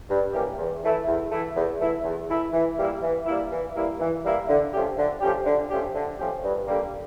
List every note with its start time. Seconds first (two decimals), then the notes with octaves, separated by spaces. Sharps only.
0.09 G2
0.33 E3 A#3 C#4 G4
0.58 E2
0.83 E3 A3 E4
1.07 E2
1.31 E3 A3 E4
1.55 E2
1.80 E3 A3 E4
2.04 E2
2.29 E3 A3 E4
2.53 E3
2.77 G3 A#3 E4
3.02 E3
3.26 G3 A#3 E4
3.51 E3
3.75 G3 A#3 E4
4.00 E3
4.24 G3 A#3 E4
4.48 D3
4.73 F3 A3 C#4 G4
4.97 D3
5.21 F3 A3 C#4 G4
5.46 D3
5.70 F3 A3 C#4 G4
5.94 D3
6.19 F3 A3 C#4 G4
6.43 G2
6.68 D3 G3 A#3